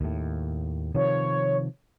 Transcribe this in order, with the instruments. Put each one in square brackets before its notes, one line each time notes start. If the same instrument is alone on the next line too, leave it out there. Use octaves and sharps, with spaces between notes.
[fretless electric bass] D#2 A2
[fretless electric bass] C3 D#3 F3 [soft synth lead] C#5